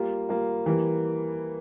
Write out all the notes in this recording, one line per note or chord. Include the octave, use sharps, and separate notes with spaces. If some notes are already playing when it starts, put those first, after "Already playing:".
Already playing: G3 A#3 F4
G3 A#3 F4
E3 G3 A#3